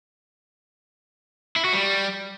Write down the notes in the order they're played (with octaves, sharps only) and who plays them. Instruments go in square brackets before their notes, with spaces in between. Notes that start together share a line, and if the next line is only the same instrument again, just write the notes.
[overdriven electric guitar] E4
F#4
G3